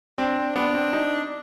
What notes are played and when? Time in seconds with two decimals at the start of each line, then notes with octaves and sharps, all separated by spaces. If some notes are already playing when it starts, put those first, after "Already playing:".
0.18 C4 D4
0.56 B3 D4
0.74 C4
0.93 D#4